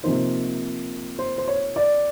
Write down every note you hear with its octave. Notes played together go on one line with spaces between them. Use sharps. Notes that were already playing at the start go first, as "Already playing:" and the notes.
C3 F3 A#3 D#4 C5
C5
C5
C#5
D5